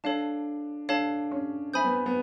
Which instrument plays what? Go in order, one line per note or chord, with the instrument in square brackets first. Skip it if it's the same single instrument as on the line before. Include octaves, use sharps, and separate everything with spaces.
[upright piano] D4 [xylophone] A4 C#5 F5 A5
[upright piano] D4 [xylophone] A4 C#5 F5 A5
[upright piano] C#4
[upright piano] C4 [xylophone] E5 G#5 B5 D#6 G6
[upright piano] B3
B3